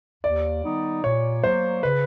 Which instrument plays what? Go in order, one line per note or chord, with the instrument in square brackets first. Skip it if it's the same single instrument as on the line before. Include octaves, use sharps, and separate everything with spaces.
[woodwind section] D#2 [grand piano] D5
[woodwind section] D#3 G3 B3 D#4
[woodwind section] A#2 [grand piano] C#5
[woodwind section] F#3 A#3 [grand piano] C5
[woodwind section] C#3 [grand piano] B4